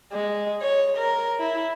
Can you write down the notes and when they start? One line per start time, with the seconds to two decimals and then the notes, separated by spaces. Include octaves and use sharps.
0.13 G#3
0.62 C#5
0.97 A#4
1.40 E4